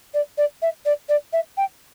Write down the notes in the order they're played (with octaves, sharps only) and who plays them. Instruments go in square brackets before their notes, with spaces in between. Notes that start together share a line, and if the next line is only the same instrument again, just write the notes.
[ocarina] D5
D5
E5
D5
D5
E5
G5